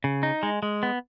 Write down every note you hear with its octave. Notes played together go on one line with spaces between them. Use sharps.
C#3
D#4
G#3
G#3
B3